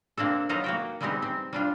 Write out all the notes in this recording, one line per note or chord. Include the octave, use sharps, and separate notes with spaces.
A#3 C4 D4 A4
F#3 D#4 F4 A4 B4 A#5
A#3 F#4 G5
G3 G#3 B3 C4 D#4 G4
C4
G3 D4 F4